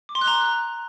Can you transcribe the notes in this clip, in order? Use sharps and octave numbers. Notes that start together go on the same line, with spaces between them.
D6
C6
F#6
A#5